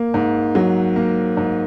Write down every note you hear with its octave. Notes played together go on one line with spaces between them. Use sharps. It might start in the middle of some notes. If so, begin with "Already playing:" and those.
Already playing: A#3
G#2
F#3
A#3
G#2